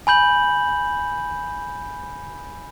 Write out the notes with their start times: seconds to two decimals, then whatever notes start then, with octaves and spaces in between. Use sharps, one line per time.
0.07 G#5 B5 G6 F#7